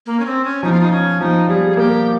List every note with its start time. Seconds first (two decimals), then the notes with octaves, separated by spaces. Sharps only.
0.06 A#3
0.20 C#4
0.26 C4
0.45 C#4
0.63 F3 D#4
0.72 F4
0.80 D#4
0.92 C#4
1.21 F3 D#4
1.48 G3 G#4
1.68 G#4
1.77 A#3 G4